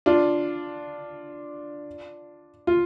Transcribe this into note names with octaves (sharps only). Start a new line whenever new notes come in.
D4 F4
F4